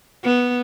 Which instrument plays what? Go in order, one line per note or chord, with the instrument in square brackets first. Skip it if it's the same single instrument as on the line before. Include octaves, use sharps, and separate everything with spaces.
[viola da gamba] B3